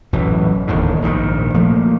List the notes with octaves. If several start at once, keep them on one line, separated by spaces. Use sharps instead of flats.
A1 F#2 B2 E3
E1 D#2 A2 D3
A#1 G#2 B2 D#3
F3 A3 A#3